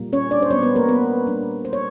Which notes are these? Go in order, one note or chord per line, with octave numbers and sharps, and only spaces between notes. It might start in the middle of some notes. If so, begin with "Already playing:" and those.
Already playing: A#2 G3 A#3
C#4 C#5
D4 D5
C5
A#2 G3 B3 C#4 D4 C#5
B3 B4
A#3 A#4
B3 B4
A#2 G3 B3 D4
C5
C#5